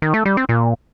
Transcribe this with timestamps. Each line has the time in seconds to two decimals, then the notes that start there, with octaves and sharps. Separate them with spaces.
0.02 D#3
0.14 A3
0.25 G3
0.37 C4
0.49 A#2